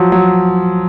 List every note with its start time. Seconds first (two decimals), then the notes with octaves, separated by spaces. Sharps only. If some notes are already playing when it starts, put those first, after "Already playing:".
Already playing: F3 F#3
0.12 F#3